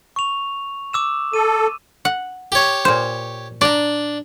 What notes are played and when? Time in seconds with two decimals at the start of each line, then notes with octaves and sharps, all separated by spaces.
0.16 C#6 F7
0.93 D6 E6 E7
1.34 A4 D#7
2.05 F#5
2.52 G4 C#5
2.85 A#2 C5
3.61 D4 D5 A#5